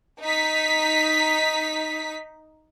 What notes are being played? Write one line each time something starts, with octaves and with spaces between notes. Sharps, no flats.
D#4 B6